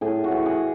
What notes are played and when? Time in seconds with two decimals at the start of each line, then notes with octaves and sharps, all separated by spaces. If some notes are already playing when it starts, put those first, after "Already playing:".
0.01 A2 G#4
0.24 F#4
0.31 E3
0.46 G#4